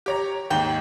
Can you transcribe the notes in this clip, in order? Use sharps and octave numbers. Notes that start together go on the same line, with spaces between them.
G4 C#5 A#5
D#2 G#2 G5